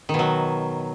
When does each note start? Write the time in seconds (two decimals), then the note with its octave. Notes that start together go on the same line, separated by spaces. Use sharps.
0.09 D#3
0.14 B2
0.19 F#3